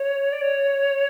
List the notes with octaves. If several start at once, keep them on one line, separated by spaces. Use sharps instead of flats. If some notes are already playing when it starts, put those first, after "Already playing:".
Already playing: C#5
D5
C#5